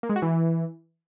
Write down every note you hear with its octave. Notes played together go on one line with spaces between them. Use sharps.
A#3
G#3
F#4
E3